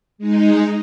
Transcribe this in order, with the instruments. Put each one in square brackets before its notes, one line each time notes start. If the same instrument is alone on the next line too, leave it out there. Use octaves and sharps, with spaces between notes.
[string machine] G#3 D#4